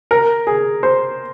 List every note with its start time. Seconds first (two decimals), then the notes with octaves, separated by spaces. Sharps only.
0.11 A#4
0.47 G#4
0.83 C5